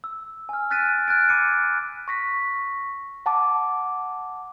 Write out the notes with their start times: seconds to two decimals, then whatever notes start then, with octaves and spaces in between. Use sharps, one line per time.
0.04 E6
0.49 G#5 F6
0.70 F6 F#6 A6 B6 D7 D#7
1.08 F6 F#6 G#6 A6 D7
1.29 B5 D6 C#7 D#7
2.08 C#6 A#6 B6
3.26 F#5 A5 D6